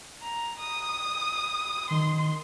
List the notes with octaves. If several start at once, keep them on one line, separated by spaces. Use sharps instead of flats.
A#5
D#6
D#3 C6